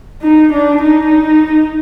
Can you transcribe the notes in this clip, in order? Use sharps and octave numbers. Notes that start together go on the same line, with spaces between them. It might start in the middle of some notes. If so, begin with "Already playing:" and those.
D#4
D4
D#4